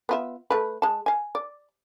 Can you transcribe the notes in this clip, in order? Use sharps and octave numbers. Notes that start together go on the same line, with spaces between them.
B3 F4 E5
A3 B4
G#3 A5
F5 G#5
D5